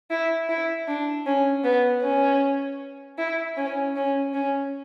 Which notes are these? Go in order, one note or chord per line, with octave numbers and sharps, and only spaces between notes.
E4
E4
D4
C#4
B3
C#4
E4
C#4
C#4
C#4